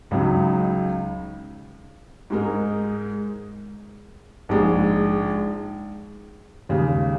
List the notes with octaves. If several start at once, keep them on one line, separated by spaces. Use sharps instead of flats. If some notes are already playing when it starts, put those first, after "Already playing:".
C#2 C#3 F#3 D#4
G#2 G#3 D#4 A#4
A#1 G#2 G#3
D#2 C#3 G#3